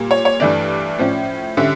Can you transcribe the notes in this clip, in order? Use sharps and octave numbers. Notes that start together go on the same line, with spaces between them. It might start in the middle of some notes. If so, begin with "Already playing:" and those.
Already playing: A#2 G3 A#3
C#5
C#5
G2 E3 A3 D4 D5
A2 F3 C#4
D3 G3 C#4 E5